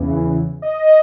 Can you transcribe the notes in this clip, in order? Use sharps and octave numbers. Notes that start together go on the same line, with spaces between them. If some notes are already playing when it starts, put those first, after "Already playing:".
Already playing: E2 C#3 E3
D#5